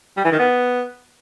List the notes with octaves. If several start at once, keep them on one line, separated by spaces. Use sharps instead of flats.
G3
E3
D#3
B3